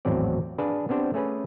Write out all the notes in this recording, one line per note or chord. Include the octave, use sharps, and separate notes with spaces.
G#1 E2 A2 F#3 C4 D5
D4 G#4 B4 F5 A5
B3 C4 D4 G4 C5
A3 C#4 G#4 B4